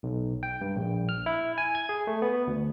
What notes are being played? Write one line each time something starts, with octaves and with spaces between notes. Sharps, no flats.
B1
G5
G2
A#1
F6
E4
G#5
G#6
G#4
A3
B3
D2